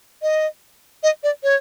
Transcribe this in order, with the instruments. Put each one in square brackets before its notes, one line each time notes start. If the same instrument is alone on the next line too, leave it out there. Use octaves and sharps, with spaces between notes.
[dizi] D#5
D#5
D5
C#5